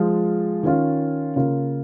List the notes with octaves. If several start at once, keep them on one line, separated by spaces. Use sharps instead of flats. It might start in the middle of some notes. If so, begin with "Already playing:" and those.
Already playing: F3 G#3 F4
D#3 C#4 F4
C#3 A#3 F4